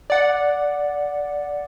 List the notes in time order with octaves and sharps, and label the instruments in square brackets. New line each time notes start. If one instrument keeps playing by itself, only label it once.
[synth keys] D5 F#5